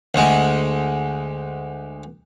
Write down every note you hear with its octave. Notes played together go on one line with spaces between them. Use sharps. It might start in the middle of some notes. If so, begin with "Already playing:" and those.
D2 G#3